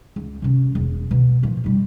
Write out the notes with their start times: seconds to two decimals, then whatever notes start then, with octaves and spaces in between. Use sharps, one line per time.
0.16 C#2
0.42 C3 C#4
0.75 E1 F#2
1.11 B2
1.42 A#2 F3
1.64 F#2 G3